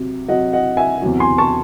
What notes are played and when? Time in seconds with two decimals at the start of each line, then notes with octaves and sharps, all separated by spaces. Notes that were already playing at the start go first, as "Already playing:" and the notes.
Already playing: C3 F#3
0.28 C3 F#3 D#5 F#5
0.53 D#5 F#5
0.77 E5 G#5
1.02 E2 C3 F#3
1.20 G#5 C6
1.38 A5 C#6